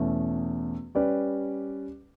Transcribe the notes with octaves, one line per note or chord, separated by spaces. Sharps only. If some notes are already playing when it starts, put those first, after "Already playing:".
Already playing: E2 B2 A3 C#4
G3 C#4 G4 B4 D5